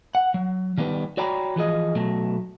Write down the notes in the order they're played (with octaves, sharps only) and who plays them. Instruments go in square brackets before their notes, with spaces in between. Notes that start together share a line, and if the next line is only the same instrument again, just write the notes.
[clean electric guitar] F#5
F#3
D#3 G3 B3 B4
F#4 C#5 D5 G5 A#5 B5
E3 F3 G#4 D#5
B2 F#3 A3